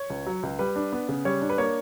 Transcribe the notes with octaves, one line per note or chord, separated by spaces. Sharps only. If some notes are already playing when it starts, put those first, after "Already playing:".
Already playing: C#5
C#2
F#3
C#2
G3 B4
D4
B3
C#3
G3 C#5
D4
B4
A#3 C#5